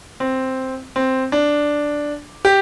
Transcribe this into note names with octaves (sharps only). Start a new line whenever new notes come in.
C4
C4
D4
G4